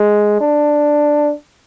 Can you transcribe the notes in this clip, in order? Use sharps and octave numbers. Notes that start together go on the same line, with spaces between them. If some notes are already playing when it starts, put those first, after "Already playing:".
Already playing: G#3
D4